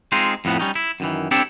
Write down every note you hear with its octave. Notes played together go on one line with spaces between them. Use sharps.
G#3 C4 D#4 F4 G#4
F2 A2 B3
G3 C#4 D#4
E4
F#2 D#3 E3
C4 D4 E4 G4 A4